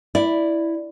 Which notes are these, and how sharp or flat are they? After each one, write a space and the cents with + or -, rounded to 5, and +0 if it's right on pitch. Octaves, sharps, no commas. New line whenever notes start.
E4 +0 D5 +5